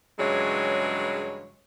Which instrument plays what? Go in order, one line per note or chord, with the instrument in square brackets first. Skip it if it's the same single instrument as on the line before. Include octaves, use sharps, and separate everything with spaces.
[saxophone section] G2 C#3 E3 F#3 G#3 C#5